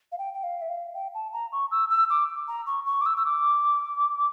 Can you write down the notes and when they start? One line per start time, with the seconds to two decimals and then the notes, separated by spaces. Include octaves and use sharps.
0.12 F5
0.18 G5
0.34 G5
0.43 F5
0.61 E5
0.69 F5
0.94 G5
1.14 A5
1.33 A#5
1.52 C#6
1.71 E6
1.90 E6
2.10 D6
2.48 A#5
2.66 C#6
2.86 C#6
3.01 D6
3.06 E6
3.17 E6
3.25 D6